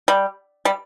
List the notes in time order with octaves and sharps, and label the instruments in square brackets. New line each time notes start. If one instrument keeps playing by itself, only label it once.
[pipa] G3
G3